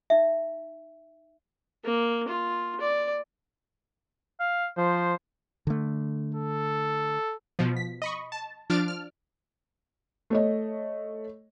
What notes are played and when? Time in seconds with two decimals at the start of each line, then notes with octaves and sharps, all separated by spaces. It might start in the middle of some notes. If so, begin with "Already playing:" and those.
0.10 D#4 E5
1.85 A#3
2.28 F4
2.81 D5
4.40 F5
4.77 F3 C5
5.67 D3 A3
6.35 A4
7.59 B2 F3
7.76 B6
8.02 D#5 B5 C#6
8.32 A5
8.70 F3 D4 F6 A6 D7
8.88 F6
10.30 A3 C#5 D#5